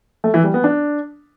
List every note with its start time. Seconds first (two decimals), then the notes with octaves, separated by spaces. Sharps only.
0.24 A3
0.34 E3
0.44 G3
0.54 B3
0.64 D4